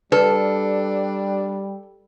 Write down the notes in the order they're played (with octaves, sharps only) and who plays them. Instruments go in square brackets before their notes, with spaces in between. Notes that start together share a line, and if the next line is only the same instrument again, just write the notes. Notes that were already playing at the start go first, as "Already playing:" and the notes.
[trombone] G3 [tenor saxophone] D4 [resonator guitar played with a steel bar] A4 [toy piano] B4